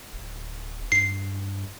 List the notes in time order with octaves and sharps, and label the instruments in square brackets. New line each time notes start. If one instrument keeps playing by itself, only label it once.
[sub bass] D1
[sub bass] G2 [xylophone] C7